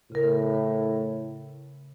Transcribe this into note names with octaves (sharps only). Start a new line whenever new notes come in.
A2 C#3 A#4